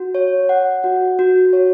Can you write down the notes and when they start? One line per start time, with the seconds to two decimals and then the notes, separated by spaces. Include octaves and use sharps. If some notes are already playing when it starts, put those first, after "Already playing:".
Already playing: F#4
0.15 C#5
0.49 F#5
0.84 F#4
1.19 F#4
1.53 C#5